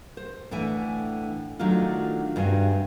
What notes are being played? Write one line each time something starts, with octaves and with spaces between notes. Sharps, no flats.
C5
A2 D3 E3 E5 G#5
D#3 F#3 A3 D4 F4
G2 C3 F#4 G#5